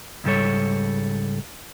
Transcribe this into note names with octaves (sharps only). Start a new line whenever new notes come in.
C#2 G#2 G3 A4 C#5